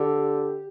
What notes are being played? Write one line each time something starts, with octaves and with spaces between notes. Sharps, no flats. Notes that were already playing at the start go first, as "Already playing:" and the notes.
Already playing: D3 G4